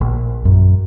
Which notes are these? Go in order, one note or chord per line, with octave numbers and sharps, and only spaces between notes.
A#1
F#2